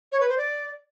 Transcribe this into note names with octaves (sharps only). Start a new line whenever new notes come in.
C#5
B4
C5
D5